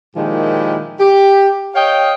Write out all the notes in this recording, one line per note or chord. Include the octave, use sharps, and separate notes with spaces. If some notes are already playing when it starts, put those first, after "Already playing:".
A#2 D#3 F3 G#3 E4 G4
G4
C#5 D#5 F5 G5